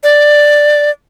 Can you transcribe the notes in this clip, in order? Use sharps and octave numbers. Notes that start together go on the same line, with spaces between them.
D5